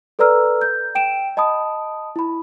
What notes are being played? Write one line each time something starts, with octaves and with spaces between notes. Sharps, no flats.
A4 B4 D5 A#5 E6 F6
G6
G5 D7 E7
D#5 A5 B5 D#6
E4 B5